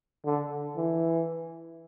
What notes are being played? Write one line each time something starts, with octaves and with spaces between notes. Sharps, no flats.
D3
E3